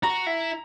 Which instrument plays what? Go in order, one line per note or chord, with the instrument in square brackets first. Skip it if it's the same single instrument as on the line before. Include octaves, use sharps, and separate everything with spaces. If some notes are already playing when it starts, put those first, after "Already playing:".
[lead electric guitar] F#4 [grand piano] A#5
[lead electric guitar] E4